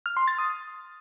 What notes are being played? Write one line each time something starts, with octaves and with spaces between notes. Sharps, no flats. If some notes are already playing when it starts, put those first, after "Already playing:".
F6
C6
A6
D#6